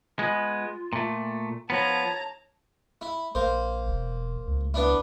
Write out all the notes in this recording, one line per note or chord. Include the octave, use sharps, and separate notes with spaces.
G#3 B3 F4
A#2 A3
F3 B3 C#5 A5 A#5
E4
A#1 A#3 C5
E1
C#2
B3 D4 E4